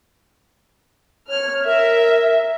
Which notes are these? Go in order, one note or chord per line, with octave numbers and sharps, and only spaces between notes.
C#5 F6
A#4 E5